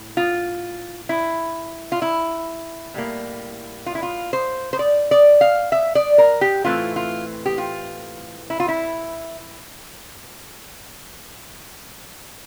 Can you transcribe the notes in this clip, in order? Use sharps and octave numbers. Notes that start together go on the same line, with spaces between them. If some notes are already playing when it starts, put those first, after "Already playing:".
Already playing: A2
F4
E4
F4
E4
A2 G3 A#3
F4
E4
F4
C5
C5
D5
D5
F5
E5
D5
A#4
G4
A2 E3 A3 C4 F4
F4
G4
F4
E4
F4
E4